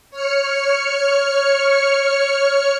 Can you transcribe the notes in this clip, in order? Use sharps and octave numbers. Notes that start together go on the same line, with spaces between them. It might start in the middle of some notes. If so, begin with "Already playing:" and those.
C#5 F6 C#7